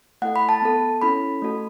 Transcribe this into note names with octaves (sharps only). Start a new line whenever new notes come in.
A3 E4 A4 F#5
B5
A5
B3 A4
C#4 E4 A4 B5
A3 F#4 A4